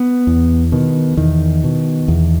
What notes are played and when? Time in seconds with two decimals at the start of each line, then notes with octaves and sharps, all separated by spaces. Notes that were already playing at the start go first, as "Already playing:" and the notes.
Already playing: B3
0.27 E2
0.72 B2 D#3
1.17 E2 D#3
1.64 B2
2.08 E2